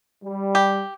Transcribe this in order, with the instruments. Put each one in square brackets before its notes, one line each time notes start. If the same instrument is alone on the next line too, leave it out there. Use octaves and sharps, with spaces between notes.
[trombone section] G3
[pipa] G4